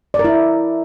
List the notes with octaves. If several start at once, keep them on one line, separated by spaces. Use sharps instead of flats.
D5
A#4
E4